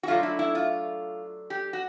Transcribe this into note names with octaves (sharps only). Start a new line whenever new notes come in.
F#4
D3 F#3 A3 F4
E4
E4
F4
G4
F#4